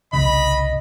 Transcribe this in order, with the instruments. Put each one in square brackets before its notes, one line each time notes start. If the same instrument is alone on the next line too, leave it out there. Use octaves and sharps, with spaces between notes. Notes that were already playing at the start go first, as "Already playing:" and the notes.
[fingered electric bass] G1 C2 C#3 [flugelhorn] D#5 [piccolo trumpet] B5